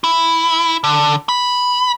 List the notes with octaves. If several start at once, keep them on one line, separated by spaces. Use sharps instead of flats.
E4
D3
B5